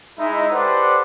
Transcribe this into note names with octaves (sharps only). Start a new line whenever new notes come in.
G#3 D#4 E4
G4 A4 B4 C5 D5 F#5